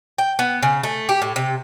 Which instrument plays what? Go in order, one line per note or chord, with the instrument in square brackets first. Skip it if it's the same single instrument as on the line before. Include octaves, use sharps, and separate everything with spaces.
[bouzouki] G5
B3
C#3
A3
G4
A2
C3